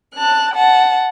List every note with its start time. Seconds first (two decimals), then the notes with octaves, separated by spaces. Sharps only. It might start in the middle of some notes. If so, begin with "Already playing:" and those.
0.14 A5 F#6
0.53 F#5 A5